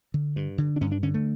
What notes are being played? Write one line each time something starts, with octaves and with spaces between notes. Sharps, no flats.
D3
G2
D3
D4
G2 C#4
D4
D3 C#4
A3